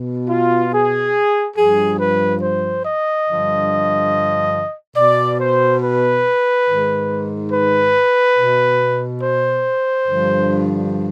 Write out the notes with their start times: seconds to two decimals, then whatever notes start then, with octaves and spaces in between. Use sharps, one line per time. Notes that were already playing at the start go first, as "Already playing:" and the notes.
Already playing: B2
0.29 F4
0.73 G#4
1.57 G2 F3 G#4
1.99 B4
2.43 C5
2.85 D#5
3.28 G2 D3 F3
4.97 B2 D5
5.40 C5
5.83 B4
6.68 G#2 D#3
7.52 B4
8.38 B2
9.23 C5
10.07 G2 D3 F3